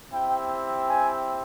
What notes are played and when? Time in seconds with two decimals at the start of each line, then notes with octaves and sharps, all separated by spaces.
0.12 C4 E4 G4 G5
0.88 G#5